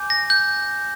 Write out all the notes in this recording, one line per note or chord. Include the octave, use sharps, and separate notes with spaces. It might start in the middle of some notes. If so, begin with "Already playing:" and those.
Already playing: G#5 D6 G6
A#6
G6